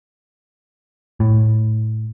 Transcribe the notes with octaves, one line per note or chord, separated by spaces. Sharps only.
A2